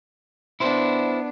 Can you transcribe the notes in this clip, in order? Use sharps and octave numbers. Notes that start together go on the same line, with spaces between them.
B3 D4 E4 C5